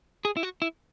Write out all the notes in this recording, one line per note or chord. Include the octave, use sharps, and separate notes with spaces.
G#4
E4
F#4
E4